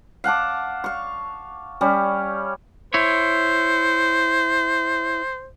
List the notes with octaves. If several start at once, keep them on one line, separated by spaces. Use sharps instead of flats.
F5 F#5 A5 D6
F5 C#6
G3 C#4
E4 C5 C#5